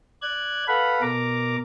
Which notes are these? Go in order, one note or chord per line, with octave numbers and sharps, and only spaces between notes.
D5 F#6 G#6
A4 B4 F5 F#5 B5
B2 A#4 A#5 D6